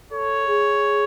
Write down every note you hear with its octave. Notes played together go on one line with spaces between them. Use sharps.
A4 C#5
G#4